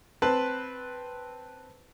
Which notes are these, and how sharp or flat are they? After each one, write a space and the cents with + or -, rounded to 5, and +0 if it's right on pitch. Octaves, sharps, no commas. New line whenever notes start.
C4 +0 B4 +0 A5 +0